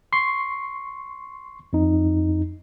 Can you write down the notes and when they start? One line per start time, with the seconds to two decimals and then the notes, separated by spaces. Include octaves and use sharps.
0.13 C6 C#6 C7
1.73 F2 D#4